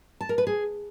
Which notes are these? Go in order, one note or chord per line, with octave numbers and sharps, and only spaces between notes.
A5
A#4
B4
G#4